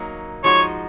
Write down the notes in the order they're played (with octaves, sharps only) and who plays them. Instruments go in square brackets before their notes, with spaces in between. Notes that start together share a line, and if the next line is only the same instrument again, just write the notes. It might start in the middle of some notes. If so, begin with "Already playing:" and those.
Already playing: [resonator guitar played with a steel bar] F#3 A#3 D#4
[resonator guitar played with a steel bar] F3 G#3 D#4 F#4 [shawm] C#5